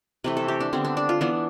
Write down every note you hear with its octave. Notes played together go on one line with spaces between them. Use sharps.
C3 E3 A3 B4
A4
G4
D4
D3 G3 B3 C4
D4
D4
F4
E3 B3 D4